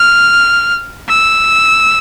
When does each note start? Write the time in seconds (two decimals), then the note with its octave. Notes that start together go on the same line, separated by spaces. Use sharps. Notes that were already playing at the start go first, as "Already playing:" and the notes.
Already playing: F6
1.09 E6